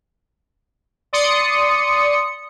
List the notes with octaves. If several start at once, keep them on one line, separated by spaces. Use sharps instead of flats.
D5 C6 D#6 C#7